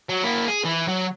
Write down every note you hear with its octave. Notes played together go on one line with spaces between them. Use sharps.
F#3
A#3 E4
G#4
E3
F#3